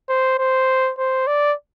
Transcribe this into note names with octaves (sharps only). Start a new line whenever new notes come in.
C5
C5
C5
D5